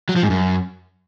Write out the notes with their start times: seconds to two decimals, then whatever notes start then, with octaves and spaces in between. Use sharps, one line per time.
0.09 F#3
0.16 F3
0.23 G#2
0.30 F#2